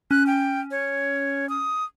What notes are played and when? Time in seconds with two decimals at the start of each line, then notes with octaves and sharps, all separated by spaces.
0.11 C#4 F#6
0.27 G5
0.71 C#5
1.49 D#6